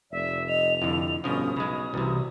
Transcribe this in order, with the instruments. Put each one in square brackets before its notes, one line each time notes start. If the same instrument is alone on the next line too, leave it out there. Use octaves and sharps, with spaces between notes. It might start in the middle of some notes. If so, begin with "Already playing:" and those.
[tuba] F1 [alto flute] D5 [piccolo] E5
[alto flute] D#5 [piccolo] F7
[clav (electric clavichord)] F2 D3 [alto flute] E4
[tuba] G1 [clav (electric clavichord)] B2 F3 [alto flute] C#4 [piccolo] D#6
[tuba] B1 [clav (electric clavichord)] C#3 G#3 [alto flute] B5
[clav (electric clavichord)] C2 C3 [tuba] E3 [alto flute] F#4